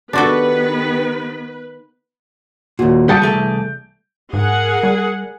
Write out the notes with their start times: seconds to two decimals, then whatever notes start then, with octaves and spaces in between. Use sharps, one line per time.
0.13 D#3 B3 D4 F#4 G4 A4 B4
2.79 D#2 A#2 F#4
3.09 G3 G4 F#5 A5 D#6 G6 D7
3.22 C2 E3 A3 G#4 A5
4.33 G#2 G#4 A#4 F#5
4.83 G3